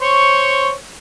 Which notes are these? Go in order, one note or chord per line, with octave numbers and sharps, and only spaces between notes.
C5 C#5 C#6